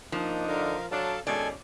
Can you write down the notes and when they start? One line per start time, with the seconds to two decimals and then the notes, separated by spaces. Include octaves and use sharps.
0.12 F3 A#3 D4 D#4
0.48 D3 A#4 F5
0.91 F#3 D4 A4 F5 A5
1.27 B2 D#3 G#3 C#4 A4 D5 G#5